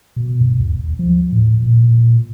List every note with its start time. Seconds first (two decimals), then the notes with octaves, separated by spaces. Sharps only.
0.16 B2
0.41 G2
0.59 D#2
0.77 D#2
0.99 F3
1.32 A2
1.62 A#2